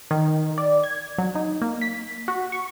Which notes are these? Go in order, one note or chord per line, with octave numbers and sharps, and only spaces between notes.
D#3
D5
G#6
F#3
D#4
A#3
B6
F#4
C#6